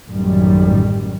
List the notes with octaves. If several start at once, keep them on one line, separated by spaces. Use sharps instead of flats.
A1 F#2 D#3 G3